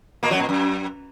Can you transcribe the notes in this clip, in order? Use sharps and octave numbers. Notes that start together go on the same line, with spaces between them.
A#2 A#3
F#2 F#3
A#2
F#2